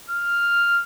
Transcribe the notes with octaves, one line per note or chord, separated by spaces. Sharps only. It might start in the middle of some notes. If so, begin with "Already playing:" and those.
F6